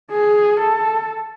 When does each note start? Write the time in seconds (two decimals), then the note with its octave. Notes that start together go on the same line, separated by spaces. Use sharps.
0.11 G#4
0.60 A4